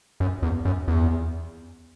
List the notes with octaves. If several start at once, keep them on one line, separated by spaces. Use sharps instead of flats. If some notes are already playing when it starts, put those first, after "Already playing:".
F#2
E2
F#2
E2